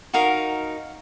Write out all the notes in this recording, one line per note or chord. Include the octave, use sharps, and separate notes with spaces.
D#4 F#4 A#4 F5